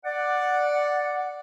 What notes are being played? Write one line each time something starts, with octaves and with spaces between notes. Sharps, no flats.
D5 F#5